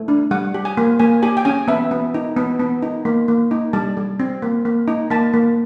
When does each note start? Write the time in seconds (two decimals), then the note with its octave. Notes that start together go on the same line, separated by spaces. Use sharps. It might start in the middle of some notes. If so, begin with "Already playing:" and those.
Already playing: A3
0.08 D4
0.31 G3 F#5
0.54 G4
0.65 G#5
0.77 A#3
1.00 A#3 G#5
1.23 G4 G#5
1.37 G5
1.45 C#4 G#5
1.68 B3 E5
1.91 B3
2.14 D#4
2.37 B3
2.59 B3
2.83 D#4
3.05 A#3
3.28 A#3
3.51 D#4
3.73 G3 A5
3.97 G3
4.20 C4
4.42 A#3
4.65 A#3
4.88 D#4
5.10 A#3 A5
5.34 A#3